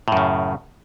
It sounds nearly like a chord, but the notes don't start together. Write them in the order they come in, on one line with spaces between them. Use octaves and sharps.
A2 F#2 C#3